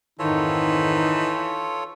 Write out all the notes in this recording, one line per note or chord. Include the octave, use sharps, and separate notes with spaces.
F2 G#2 D#3 E3 D#4 F4 A4 C#5